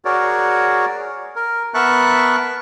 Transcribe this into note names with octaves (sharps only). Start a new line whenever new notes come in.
F#4 G#4 A#4 C#5 D5
A#4
B3 A#4 E5 A5 C#6 F#6